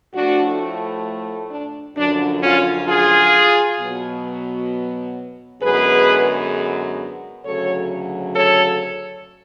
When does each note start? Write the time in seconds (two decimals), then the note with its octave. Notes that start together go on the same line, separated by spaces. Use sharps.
0.14 A2 F3 A3 D4 F#4
1.51 D4
1.97 F#2 D3 F3 D4
2.43 C#4 F4
2.88 F4 G#4
3.80 B2 F#3 B3
5.62 F#2 D3 G#3 B3 G#4 B4
7.44 D2 C#3 F#3 A4 C#5
8.35 A4 C#5